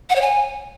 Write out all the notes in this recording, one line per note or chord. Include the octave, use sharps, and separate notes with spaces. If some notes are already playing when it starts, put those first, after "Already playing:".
F#5
C#5
G#5